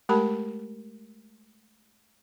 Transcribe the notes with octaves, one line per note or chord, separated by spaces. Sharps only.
G#3 A3 G4 A#4 A5 B5